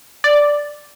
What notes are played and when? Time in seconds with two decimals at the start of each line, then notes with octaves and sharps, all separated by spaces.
0.24 D5